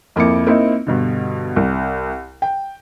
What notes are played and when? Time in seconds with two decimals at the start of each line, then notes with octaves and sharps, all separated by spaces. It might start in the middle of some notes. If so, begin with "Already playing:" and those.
0.16 F2 A#3 E4 D6 C#7
0.47 A#3 C4 D#4 E4
0.87 G2 B2 D3
1.56 C2
2.42 G5